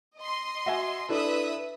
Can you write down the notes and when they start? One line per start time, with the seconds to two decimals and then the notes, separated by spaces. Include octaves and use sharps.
0.18 D#5 C6
0.66 F#4 E5 G#5
1.09 D4 E4 A4 B4 E5 D#6